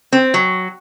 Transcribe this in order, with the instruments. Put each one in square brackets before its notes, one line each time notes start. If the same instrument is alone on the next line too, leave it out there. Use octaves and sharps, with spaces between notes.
[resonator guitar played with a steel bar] C4
F#3